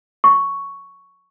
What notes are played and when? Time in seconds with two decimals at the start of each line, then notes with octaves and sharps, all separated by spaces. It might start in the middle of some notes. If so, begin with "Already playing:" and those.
0.24 C#6